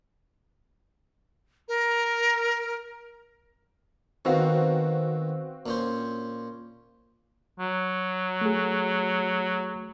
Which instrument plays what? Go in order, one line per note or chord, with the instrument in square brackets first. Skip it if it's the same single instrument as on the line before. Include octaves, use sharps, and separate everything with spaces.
[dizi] A#4
[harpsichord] D#3 B3 [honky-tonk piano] C4 F#4 F5
[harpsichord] A#2 C#4 C5
[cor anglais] F#3
[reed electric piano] A3 G#4